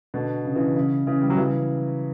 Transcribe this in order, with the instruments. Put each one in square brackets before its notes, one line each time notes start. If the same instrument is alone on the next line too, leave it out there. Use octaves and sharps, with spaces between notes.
[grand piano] B2 D3
C#3
C#3 E3
C#3
C#3 E3
G3
F#3
C#3 E3